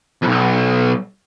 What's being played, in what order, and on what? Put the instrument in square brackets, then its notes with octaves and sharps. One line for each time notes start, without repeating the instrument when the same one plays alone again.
[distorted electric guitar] B1 F2